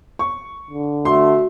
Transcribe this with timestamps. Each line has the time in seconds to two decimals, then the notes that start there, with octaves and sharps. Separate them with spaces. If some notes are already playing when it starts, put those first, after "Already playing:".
0.19 C#6
0.70 D3
1.05 A3 F#4 C6